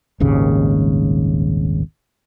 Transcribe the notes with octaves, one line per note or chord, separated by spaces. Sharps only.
D#1 G#1 D#2 C#3